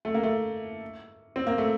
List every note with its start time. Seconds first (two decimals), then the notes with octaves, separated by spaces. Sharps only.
0.05 A3
0.14 A#3
0.23 A3
1.36 C4
1.47 A#3
1.58 A3